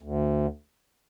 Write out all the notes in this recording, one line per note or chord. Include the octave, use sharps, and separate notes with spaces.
D2